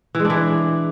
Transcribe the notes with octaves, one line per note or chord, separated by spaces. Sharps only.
E3
G#3
D4
E3